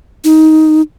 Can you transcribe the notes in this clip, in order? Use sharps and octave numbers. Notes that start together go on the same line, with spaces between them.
D#4